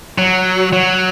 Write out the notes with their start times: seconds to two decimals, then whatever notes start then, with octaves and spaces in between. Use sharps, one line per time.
0.18 F#3
0.73 F#3